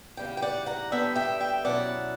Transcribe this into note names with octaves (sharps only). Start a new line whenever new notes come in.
E2 C#3 G3 G5
G5
D5 F#5
F#5 A#5
D3 G3 B3 D4 E5 G5
E5 G5
E5 G5
B2 F#3 C#4 E4 D5 F#5